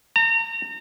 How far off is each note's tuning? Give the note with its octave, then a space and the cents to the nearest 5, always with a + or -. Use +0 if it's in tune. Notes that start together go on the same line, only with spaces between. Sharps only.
A#5 -35